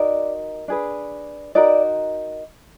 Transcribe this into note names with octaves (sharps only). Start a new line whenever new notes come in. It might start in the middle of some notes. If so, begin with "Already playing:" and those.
Already playing: D#4 F#4 A#4 D5
D4 G#4 B4
D#4 F#4 A#4 D5